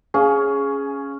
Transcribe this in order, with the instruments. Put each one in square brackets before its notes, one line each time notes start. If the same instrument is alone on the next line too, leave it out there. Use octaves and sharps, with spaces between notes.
[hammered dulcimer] C#4 [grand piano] G#4 F5